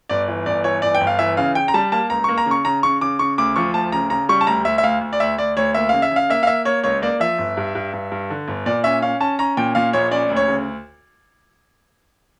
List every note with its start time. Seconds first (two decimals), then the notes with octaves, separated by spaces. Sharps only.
0.09 G1 D5
0.28 E3
0.46 G1 D5
0.64 E3 C#5
0.82 G1 D5
0.95 G5
1.01 G1
1.07 F5
1.19 E3 E5
1.37 C#3 F5
1.55 C#3 G5
1.68 A#5
1.74 G3 A5
1.92 A#3 A5
2.10 C#2 A#5
2.24 A#3 C#6
2.38 A#5
2.46 C#3
2.51 C#6
2.65 C#3 A#5
2.83 C#3 C#6
3.01 C#3 D6
3.19 C#3 C#6
3.38 D2 D6
3.56 F3 C#6
3.74 D2 A5
3.92 C#3 A#5
4.10 C#3 A#5
4.29 G3 C#6
4.41 A5
4.47 D2 A#5
4.65 D2 E5
4.78 E5
4.83 D2 F5
5.01 D2
5.13 D5
5.20 D2 E5
5.38 D2 D5
5.57 D2 C#5
5.74 A#3 E5
5.89 C#3 F5
6.02 E5
6.11 C#3
6.16 F5
6.30 A#3 E5
6.43 F5
6.47 A#3 E5
6.65 A#3 C#5
6.84 C#2 C#5
7.02 A#3 D5
7.20 F3 E5
7.38 G1
7.57 G2
7.75 G2
7.93 G2
8.12 G2
8.30 D3
8.48 G1
8.66 A#2 D5
8.84 C#4 E5
9.02 C#4 F5
9.20 C#4 A5
9.39 C#4 A#5
9.57 A#2 G5
9.75 A#2 F5
9.93 A#1 C#5
10.11 C#4 D5
10.30 D2
10.37 C#5
10.48 C#3